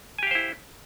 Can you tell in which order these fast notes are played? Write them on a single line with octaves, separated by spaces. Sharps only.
G#5 G4 F5 C5 E4